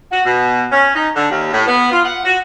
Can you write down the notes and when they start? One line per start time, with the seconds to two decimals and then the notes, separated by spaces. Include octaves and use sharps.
0.11 F#4
0.25 B2
0.71 C#4
0.95 D#4
1.15 D3
1.30 D#2
1.52 A2
1.66 B3
1.91 F4
2.04 F#5
2.24 F#4